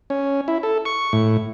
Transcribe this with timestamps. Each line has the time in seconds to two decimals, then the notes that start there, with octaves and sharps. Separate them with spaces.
0.10 C#4
0.48 E4
0.63 A4
0.85 C#6
1.13 A2